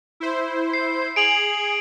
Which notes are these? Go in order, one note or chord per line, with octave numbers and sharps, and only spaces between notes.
E4 C5
C7
G#4 D7 F7 F#7